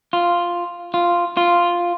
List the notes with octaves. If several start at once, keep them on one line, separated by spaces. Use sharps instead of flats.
F4
F4
F4